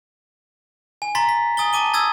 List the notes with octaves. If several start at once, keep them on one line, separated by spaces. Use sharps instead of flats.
G#5
A#5 C6 A6 B6
B6
G#5 D#6 A6 G7
A5 D6 D#7 G7
D#6 E6 G#6 A6